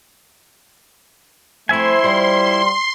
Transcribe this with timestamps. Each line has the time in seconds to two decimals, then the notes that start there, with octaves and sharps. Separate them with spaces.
1.69 F3 A3 C4 E4 E5 G#5 C6
2.04 G3 F4 C5 D#5